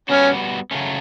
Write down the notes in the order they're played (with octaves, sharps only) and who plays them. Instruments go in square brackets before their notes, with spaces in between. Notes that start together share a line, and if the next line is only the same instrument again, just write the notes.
[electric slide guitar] G3 B3 F#4 [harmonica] C#4
[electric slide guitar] C#3 F#3 A3 C#4